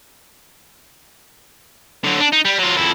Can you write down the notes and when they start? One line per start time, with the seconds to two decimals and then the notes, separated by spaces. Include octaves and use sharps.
2.04 D3 F#3
2.20 D4
2.32 D#4
2.45 G3
2.58 F#3 F4
2.77 F2 E4